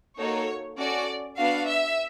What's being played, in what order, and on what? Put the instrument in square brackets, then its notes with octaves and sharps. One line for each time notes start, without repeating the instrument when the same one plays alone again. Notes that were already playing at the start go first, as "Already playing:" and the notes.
[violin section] A#3 D#4 F#4 A4 C#5
C#4 F#4 A4 D5
B3 D4 F#4 F5
E5